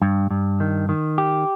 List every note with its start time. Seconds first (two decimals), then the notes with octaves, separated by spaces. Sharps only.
0.02 G2
0.31 G2
0.60 D#3
0.89 D#3
1.18 G4